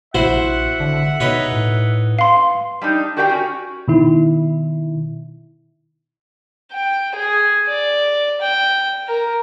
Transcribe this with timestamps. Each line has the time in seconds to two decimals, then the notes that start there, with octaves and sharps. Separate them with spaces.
0.15 A#1 E4 F#4 C5 E5 F#5
0.80 D3
1.20 B2 D#4 B4 C#5
1.52 A2
2.19 F5 C6
2.81 G3 D4 D#4
3.17 F#4 G4 A#4 D5 F5 G5
3.29 C#4 F#4
3.88 B2 D#3 E4
6.72 G5
7.15 G#4
7.67 D5
8.41 G5
9.08 A#4